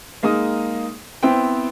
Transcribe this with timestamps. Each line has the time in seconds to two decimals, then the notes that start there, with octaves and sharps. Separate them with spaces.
0.23 G#3 A#3 D#4 D#6
1.23 B3 C4 E4 C5 G5